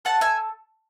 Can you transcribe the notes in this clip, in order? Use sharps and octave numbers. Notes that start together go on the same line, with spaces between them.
A4 F#5 A5
E5 G#5